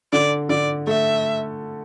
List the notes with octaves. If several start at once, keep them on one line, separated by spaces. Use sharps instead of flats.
D3 D5
D3 D5
A3 E5